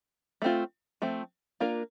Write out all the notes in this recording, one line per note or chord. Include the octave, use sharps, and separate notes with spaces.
A3 C4 F4
F3 A3 C4
A#3 D4 F4 A#4